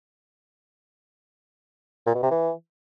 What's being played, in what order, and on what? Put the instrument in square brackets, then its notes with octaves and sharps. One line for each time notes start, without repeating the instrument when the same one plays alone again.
[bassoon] A#2
B2
C3
E3